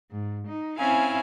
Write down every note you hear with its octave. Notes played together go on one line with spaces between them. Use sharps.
G#2
D#4
C4 C#4 E4 F5 G#5